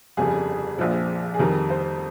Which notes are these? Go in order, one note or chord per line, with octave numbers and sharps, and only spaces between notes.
G1 F2 C#3 G3 G#4
A#1 A#2 F3
G#4
F2 D#3 G3 A#4
C5